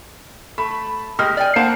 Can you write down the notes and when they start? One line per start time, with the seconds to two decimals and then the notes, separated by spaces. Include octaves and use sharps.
0.58 A3 B5
1.19 G#3 A#3 G4 F6
1.37 D5 G5 G#5
1.56 A#3 C5 F#5 A5